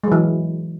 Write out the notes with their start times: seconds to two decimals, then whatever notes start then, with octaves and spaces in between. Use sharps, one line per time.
0.04 G#3
0.08 F#3
0.12 E3